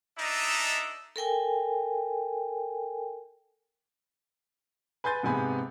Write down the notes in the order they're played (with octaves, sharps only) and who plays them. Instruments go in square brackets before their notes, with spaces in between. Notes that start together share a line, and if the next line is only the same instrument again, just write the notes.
[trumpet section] D4 D#4 A4 D#5 E5
[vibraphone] A4 A#4 G5 G#5
[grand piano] B4 G#5 C6 G6 A6
G#2 C3 B3 G#5 B5